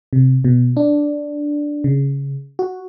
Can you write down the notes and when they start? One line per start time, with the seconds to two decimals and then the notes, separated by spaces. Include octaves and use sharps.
0.13 C3
0.45 B2
0.77 D4
1.84 C#3
2.59 F#4